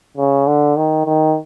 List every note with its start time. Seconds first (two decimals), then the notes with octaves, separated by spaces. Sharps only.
0.18 C#3
0.47 D3
0.77 D#3
1.06 D#3